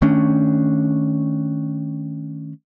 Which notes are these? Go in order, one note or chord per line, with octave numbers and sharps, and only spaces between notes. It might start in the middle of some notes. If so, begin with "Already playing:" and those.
D#3 A3 C#4 D4